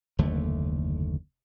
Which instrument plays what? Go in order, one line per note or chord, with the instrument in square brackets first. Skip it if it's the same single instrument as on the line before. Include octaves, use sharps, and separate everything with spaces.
[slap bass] F#1 D#2 D3 A3